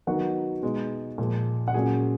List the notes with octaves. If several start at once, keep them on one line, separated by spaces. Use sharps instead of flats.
D#3 F#3 B3 D#4 F#4 F#5
B2 G#3 D#4
A#2 F3 G#3
F#5
A#2 F#3 A#3 C#4 G#4 G#5